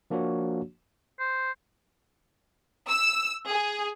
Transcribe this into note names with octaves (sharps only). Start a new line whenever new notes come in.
F3 A#3 D4 F#4 C#5
C5
E6
G#4